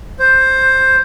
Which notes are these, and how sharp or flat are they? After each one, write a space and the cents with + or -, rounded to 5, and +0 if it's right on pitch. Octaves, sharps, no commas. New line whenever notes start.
C5 +10